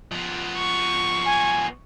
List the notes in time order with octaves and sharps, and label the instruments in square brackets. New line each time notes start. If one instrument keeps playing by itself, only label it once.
[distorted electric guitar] F3 B3
[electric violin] C#6
[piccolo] G#5